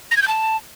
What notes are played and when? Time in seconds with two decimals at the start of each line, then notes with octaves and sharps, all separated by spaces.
0.11 A#6
0.17 G#6
0.22 G6
0.28 A5